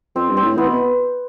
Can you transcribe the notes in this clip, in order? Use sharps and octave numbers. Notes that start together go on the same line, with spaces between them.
F2 C4
G2
C4
A2
E3 B3
B2